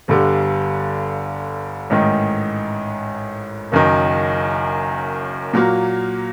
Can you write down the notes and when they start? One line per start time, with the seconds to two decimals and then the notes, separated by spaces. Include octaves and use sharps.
0.08 G1 G2 D3 G3
1.90 A1 G#2 D#3
3.72 F#1 F#2 D#3
5.53 A#2 F#3 A#3